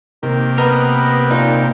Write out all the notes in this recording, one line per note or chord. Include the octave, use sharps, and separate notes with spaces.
C3 D#3 A#3 G4
B3 A#4 B4 D#5
A#2 D#4